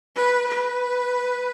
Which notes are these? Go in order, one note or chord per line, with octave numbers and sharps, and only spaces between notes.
B4
B4